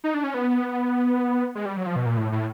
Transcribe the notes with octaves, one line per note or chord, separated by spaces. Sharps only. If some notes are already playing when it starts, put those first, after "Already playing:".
D#4
D4
C#4
B3
G#3
G3
F#3
F3
B2
A#2
A2
A2